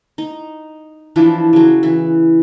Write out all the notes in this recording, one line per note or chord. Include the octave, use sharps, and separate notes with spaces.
D#4
E3 F3 D4 E4
C#3 F#3
E3